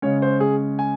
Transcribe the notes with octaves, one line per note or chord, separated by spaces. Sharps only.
C#3 G#3 C#4 C#5
C5
G#4
G#5